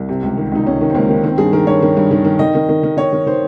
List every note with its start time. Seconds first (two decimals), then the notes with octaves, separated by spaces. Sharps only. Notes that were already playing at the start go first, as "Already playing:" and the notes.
Already playing: C2
0.09 C3
0.23 C#2
0.37 D#3
0.52 C#2 D#4
0.66 C#2 C#4
0.81 D#3
0.90 C4
0.94 C#2 A#3
1.09 D#3
1.24 D#3 C4
1.38 G2 G#4
1.53 D#3 A#4
1.67 G2 C#5
1.82 D#3
1.97 G2
2.11 D#3
2.25 D#3
2.39 D#3 D#5
2.55 D#3
2.69 D#3
2.83 D#3
2.97 D#3 C#5
3.13 D#3
3.26 D#3 C5